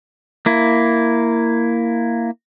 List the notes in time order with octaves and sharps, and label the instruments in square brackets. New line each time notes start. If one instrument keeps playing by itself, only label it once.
[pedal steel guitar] A#3 E4